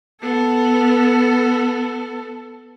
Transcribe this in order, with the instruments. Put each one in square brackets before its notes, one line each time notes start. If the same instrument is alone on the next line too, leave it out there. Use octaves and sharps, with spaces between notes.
[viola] B3 A4